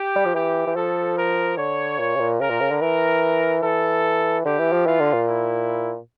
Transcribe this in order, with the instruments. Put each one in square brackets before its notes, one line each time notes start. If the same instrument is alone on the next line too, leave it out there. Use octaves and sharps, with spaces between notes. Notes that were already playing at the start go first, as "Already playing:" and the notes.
Already playing: [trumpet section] G4
[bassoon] G3
F3
[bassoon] E3 [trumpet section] G4
[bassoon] E3
[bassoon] F3 [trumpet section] A4
[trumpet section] A#4
[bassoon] D3 [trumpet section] C#5
[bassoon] A#2
C#3
A#2
[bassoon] C#3 [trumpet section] A#4
[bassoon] A#2
C#3
D3
[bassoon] E3 [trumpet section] A#4
[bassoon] E3 [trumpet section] A4
[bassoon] D3 [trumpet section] G4
[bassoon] E3
F3
[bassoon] E3 [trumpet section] F4
[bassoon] D3
A#2
[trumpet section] E4